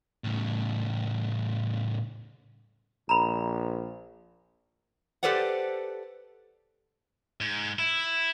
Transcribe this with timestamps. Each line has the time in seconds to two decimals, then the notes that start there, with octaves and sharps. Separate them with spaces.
0.24 A2 C#3
3.09 A#1 A#5 B5
5.23 G4 A4 B4 C5 D5 F#5
7.41 G#2
7.79 E4